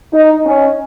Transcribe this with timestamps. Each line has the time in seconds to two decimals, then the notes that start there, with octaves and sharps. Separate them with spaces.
0.13 D#4
0.45 C#4